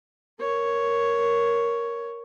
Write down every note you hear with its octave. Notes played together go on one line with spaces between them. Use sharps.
A#4 C#5